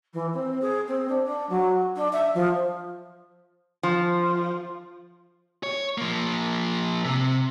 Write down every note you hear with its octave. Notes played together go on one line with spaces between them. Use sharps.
E3
C4
G#4
C4
D4
D4
F#3
D4
E5
F3
F3
C#5
F3 A#3
C3